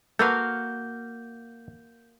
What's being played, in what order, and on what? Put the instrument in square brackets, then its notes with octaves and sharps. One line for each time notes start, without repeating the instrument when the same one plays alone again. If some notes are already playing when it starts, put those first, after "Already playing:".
[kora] A#3 F#4 F5 [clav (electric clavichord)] A4 B4 [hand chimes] G6